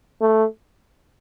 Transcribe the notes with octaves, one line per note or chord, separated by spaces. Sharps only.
A3